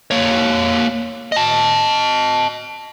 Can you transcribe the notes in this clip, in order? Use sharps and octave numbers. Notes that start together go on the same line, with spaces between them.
A#3 C#5
D#5 A5